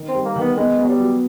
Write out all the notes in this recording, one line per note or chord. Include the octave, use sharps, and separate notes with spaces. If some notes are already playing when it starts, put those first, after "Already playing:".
Already playing: D#3
C4
G3
A#3
D#3 B3
G#3 B3
B3
F#3
G3
F#3